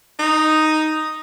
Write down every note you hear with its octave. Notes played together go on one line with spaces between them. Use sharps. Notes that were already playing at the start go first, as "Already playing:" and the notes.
D#4